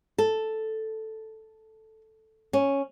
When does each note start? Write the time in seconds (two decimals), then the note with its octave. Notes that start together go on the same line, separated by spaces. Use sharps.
0.18 A4
2.53 C#4